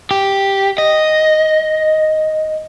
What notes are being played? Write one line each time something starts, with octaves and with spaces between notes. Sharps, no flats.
G4
D#5